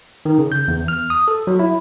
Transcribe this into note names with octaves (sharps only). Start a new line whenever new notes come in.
D#3
C#3
G6
E2
F6
D#6
A4
F#3
E4